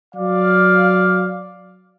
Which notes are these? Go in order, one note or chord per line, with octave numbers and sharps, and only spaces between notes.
F#3 D5 F5